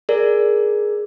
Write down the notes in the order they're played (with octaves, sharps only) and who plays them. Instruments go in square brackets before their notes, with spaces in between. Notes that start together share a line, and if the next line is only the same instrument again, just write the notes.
[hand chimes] G#4 A#4 D5